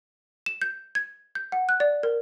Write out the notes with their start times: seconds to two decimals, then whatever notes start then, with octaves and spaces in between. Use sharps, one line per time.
0.46 E7
0.62 G6
0.95 G#6
1.35 G6
1.52 F#5
1.69 F#6
1.80 D5
2.03 A#4